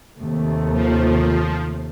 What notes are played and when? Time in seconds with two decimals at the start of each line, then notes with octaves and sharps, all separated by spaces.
0.18 D#2 C3 A3
0.73 F3